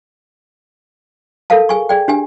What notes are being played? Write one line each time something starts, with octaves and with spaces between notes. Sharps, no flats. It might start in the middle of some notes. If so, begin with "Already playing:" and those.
A4 A#4 F5 A5
G#4 G#5 C#6
G#4 D5 G5
D4 G4 G#5